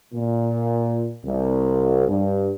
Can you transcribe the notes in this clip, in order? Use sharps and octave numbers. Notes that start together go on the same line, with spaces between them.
A#2
C2
G2